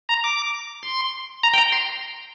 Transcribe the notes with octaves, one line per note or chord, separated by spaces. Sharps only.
A#5
D6
C6
A#5
G5
A#5
C6